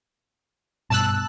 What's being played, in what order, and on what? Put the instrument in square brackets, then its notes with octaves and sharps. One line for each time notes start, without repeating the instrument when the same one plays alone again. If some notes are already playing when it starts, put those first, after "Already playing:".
[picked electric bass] G2 B2 [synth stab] A5 E6 F#6